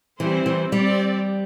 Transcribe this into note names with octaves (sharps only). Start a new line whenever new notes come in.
E3 G3 C4 E4 C5
E3
G3 C4 G4 D5